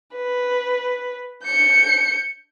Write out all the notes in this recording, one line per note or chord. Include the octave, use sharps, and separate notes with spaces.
B4
G6 C#7